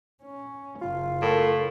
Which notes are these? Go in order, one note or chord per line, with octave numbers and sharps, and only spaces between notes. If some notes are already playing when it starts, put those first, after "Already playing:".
C#4
F#1 F4
A2 A#4